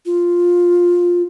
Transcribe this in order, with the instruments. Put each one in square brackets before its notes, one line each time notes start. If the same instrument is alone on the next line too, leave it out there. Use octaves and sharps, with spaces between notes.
[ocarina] F4